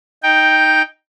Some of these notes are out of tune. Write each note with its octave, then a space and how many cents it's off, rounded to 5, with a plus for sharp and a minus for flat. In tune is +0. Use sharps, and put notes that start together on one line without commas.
D#4 +0 G5 +0